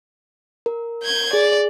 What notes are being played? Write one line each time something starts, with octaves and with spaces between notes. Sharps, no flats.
A#4
G6 G#6
G#4 D5